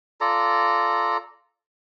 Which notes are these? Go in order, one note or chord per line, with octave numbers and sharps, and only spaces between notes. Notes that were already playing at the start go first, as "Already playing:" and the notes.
F4 A4 D5 A#5